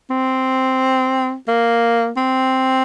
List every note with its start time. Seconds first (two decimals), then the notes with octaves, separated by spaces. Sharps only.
0.10 C4
1.48 A#3
2.17 C4